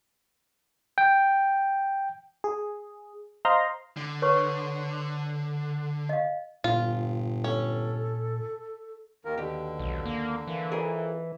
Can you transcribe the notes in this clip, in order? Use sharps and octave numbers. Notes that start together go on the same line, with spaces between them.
G5
G#4
C5 D#5 F5 A#5 C6
D3
B4 C#5 C#6
D#5 F5
G1 A#2 F4
C#4 A4
D#2 D#3 A#3 A#4
D#2 B2 D3 G4
B1
A#3
E3 A#3
F2 G#4 A#4